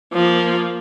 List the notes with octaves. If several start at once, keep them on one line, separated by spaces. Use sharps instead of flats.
F3 A#3